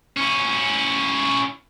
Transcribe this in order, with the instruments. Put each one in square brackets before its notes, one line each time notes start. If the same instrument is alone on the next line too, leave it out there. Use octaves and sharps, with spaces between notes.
[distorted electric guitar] C#4 E4